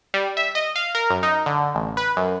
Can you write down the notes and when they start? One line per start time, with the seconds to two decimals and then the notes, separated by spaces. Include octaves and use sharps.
0.14 G3
0.37 E5
0.55 D#5
0.76 F5
0.95 A#4
1.10 F#2
1.23 D#4
1.46 D3
1.75 A1
1.97 B4
2.17 F#2